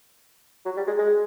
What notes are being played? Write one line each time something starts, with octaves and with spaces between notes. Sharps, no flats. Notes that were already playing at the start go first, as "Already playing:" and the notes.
F#3
G3
G#3
G#3